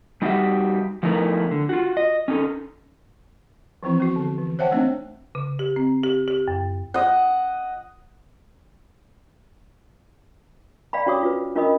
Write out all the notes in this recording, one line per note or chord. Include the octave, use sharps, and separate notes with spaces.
G3 D#4 F#4 G4 E5
F3 A3 B3 D#4 E4 A#4
D3
F4 F#4
D#5
C#4 D#4 A4
E3 F3 C4 E4
B3 F#4
D3
E3
C5 C#5 E5 F#5 G5 A5
A3 A#3 C4 D4 D#4 C5
C#3
G4
C4
G4
G4
F#2
D#5 F#5
D5 F5 G5 B5
C#4 F#4 C#5 D6 D#6
F4 B4
C#4 F4 A#4 D#5 B5 D#6